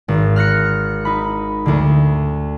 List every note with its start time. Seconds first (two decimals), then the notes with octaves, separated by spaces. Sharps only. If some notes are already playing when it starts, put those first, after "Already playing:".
0.08 G#1
0.36 F6 F#6 A#6 C#7
1.05 D#4 B5
1.66 D2 D3